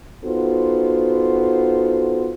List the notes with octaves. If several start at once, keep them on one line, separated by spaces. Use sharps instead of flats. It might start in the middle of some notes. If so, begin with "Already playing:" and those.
B3 D#4 F4 F#4 A4 C5